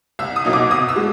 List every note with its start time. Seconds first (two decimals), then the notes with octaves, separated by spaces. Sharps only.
0.19 C2 E6
0.36 D#6
0.45 B2 F#3 A#3 D#4
0.53 D6
0.71 B2 D#6
0.89 E6
0.96 G#3